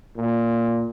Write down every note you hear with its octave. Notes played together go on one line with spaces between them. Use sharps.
A#2